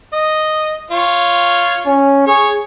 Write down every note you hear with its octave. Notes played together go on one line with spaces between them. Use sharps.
D#5
F4 C#5
C#4
G#4 C#5